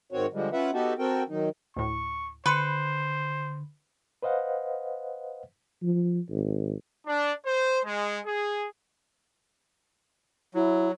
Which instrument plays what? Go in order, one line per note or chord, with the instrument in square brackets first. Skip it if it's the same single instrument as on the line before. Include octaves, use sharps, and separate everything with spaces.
[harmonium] G#2 D#3 C4 F#4 C#5
D3 F3 G3 G#3
C#4 F4 B4 E5 F#5
B3 D#4 F#4 G4 A4
C4 F#4 A4 A#4 G5
D#3 F#3 D#4
[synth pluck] D2 A2 [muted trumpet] C#6
[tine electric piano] D3 [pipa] B4 [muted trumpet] C5 [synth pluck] B5 C6 C#7
[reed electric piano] B4 C5 D#5 F5 F#5
[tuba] F3
G#1
[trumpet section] D4
C5
G#3
G#4
[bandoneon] F#3 [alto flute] E4